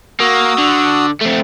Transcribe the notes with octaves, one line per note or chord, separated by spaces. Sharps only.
A#3 F#4 D#6 E6
D3
A3 C4